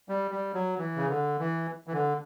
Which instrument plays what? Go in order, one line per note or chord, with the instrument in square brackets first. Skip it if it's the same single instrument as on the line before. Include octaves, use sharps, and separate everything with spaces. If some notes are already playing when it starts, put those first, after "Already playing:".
[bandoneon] G3
G3
F#3
E3
C#3
D3
E3
E3
D3